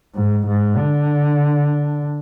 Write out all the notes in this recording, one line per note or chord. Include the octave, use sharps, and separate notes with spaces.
G#2
G#2
D3